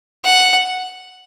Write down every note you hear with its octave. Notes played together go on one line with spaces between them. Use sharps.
F#5